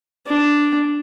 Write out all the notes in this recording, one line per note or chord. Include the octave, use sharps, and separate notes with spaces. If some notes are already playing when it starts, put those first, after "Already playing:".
D4